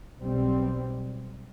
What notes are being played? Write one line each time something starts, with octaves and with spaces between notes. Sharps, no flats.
B1 B2 G3 C4